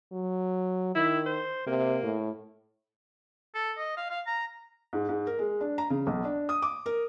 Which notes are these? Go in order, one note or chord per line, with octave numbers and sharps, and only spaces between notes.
F#3
D#3 E4
C5
C3 A#3
A2
A4
D#5
F5
F5
A#5
G#2
G#2
A#4
G#3
D4
A#5
C#3
B1
D4
D#6
D6
A#4